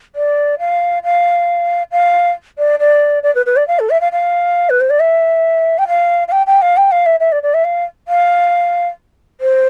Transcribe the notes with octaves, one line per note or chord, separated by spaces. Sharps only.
D5
F5
F5
F5
D5
D5
D5
B4
B4
D5
F5
A4
E5
F5
F5
B4
C5
D5
E5
G5
F5
F5
G5
G5
F5
G5
F5
E5
E5
D5
D5
E5
F5
F5
C5